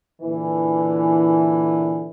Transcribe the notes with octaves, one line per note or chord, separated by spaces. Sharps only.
A#2 D3 E3